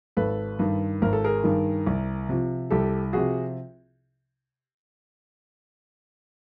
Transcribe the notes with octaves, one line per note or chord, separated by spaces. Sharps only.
G#1 A4 B4
G2 D#3
G#1 A#4
A4
G#4 A#4
G2 D#3
C2
C3 F3
C2 G4 A4
C3 F3 F#4 G#4